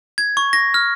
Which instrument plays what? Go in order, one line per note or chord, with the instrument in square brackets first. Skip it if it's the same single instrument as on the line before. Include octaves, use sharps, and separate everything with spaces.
[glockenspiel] G#6
C#6
A#6
F6